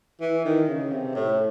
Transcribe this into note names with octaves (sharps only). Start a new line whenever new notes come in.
E3
D#3
C#3
C3
A2